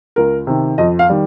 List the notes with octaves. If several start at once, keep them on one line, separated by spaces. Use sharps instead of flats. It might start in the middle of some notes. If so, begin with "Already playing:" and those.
C#2 A#4
C3 D#3
F2 D#5
F5
D#3 G3